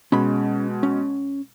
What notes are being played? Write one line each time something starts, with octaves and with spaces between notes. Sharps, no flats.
B2 G#3 C#4 B5
C#4